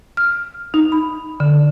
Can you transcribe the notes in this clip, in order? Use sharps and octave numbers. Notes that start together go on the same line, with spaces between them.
F6
D#4
B5
D3